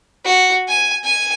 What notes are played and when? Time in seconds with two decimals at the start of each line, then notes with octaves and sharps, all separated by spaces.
0.25 F#4
0.68 G#5
1.04 G#5